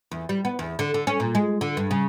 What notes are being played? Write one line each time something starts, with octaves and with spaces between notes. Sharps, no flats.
E2
G3
B3
E2
D3
D3
C#4
A#2
G#3
D3
G2
C#3